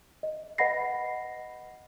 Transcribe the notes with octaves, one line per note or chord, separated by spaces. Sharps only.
D#5
B4 D#5 F#5 B5 A#6 C7